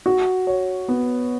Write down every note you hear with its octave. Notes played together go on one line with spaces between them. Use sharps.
F#4
C#5
B3